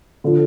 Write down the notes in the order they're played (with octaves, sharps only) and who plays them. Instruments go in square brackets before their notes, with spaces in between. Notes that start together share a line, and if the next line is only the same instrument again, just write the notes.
[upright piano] D3 F3